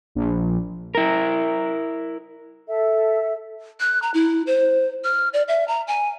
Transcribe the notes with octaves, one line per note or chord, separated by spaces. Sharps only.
A#1
E4 A#4
A4 E5
F#6
A#5
E4
C5
F6
D5
E5
A#5
G#5